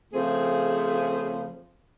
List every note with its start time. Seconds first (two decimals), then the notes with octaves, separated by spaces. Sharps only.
0.14 C#3 F3 A3 C4 G#4